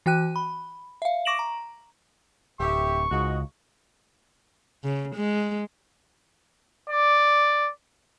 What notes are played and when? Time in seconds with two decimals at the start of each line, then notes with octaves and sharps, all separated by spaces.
0.06 E3 F#4 G5 F#6 D#7
0.36 B5
1.02 E5 F5
1.25 C#6 D6 A#6 D7 E7 F#7
1.39 A#5
2.60 D1 G4 E5 C#6
3.11 C#2 G#2 F#4 D#5
4.84 C#3
5.15 G#3
6.89 D5